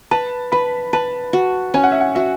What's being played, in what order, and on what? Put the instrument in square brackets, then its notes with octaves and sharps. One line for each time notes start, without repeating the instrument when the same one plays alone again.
[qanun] B4 [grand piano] A5
[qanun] B4 [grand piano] B5
[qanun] B4 [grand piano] A5
[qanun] F#4
[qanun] C#4 [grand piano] G#5
[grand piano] F#5
E5
F#5
[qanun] F#4 [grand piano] E5